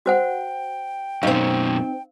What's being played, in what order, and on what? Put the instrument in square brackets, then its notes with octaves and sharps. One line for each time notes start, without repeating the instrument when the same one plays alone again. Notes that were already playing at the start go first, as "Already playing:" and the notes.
[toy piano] F#4 C5 F#5 [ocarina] G5
[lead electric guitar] F#2 B2 [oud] C4 D#4 [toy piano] F5